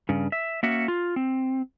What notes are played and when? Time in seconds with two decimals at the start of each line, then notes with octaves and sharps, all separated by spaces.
0.09 G2 C#3
0.32 E5
0.63 A#3 C#4 F#4 E5
0.88 F4
1.16 C4